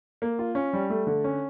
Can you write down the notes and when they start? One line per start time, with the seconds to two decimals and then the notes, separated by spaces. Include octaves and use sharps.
0.22 A#3
0.39 F4
0.55 C#4
0.73 G3
0.90 A3
1.07 D3
1.24 C#4